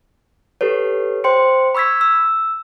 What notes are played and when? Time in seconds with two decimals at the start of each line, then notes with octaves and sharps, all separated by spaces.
0.61 G4 A4 B4 C#5
1.24 C5 G5 C6 C#7
1.75 B5 C#6 E6 G#6 B6
2.01 E6